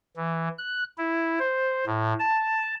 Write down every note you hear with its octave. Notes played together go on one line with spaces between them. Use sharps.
E3
F#6
E4
C5
A2
A5